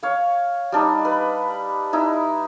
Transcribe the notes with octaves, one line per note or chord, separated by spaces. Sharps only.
C#5 F5
G3 D4 D#4
B4
D#4 E4